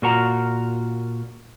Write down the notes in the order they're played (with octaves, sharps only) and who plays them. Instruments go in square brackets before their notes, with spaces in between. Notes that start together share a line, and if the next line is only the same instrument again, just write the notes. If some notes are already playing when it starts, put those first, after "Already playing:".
[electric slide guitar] A#2 F4 F#4 A#4 F#5 A#5